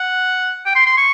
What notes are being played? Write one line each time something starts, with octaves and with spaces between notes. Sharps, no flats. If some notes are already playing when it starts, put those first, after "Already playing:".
Already playing: F#5
G5
C6
C6
C#6